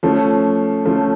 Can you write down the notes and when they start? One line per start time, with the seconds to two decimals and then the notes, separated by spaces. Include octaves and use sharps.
0.03 F3 A3 C#4
0.85 F3 A3 C#4